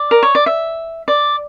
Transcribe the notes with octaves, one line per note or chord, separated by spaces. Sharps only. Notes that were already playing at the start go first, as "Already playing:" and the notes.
Already playing: D5
A#4
C#5
D5
E5
D5